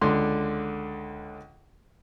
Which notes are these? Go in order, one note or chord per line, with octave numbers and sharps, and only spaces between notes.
C#2 D3 C6